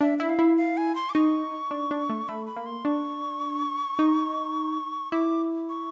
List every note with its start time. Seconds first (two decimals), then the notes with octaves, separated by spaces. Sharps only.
0.01 D4 E5
0.19 E4 E5
0.29 F5
0.39 E4
0.57 F5
0.77 G#5
0.95 C6
1.10 D6
1.14 D#4 C#6
1.71 D4
1.91 D4
2.10 A3
2.29 A3 B5
2.47 B5
2.56 A#3
2.66 C6
2.85 D4 C#6
3.99 D#4
5.12 E4 D6
5.69 C#6